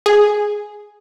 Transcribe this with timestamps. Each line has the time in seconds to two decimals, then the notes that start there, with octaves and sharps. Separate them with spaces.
0.06 G#4